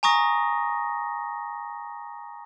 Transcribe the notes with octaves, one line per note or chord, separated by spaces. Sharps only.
G#5 A#5 C#6 D#6 A#6